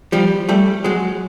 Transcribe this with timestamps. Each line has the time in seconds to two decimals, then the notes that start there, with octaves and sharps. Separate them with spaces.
0.12 F3 G3
0.49 G3 A3
0.84 F#3 G#3